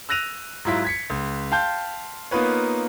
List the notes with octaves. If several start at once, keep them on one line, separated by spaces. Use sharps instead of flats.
E6 F#6 A#6 D#7 F7
G#2 F#3 E4 F4 B6
G#6 B6 C#7
C#2
F5 G5 A5 C6 G6
A#3 B3 D#4 F4 B4 C#5